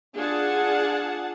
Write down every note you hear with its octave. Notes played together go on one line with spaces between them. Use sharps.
D4 F4 G#4 F#5 A5